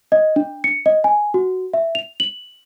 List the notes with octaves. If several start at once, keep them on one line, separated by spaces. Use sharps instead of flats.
D#5
D4
C#7
D#5
G#5
F#4
E5
F7
F#7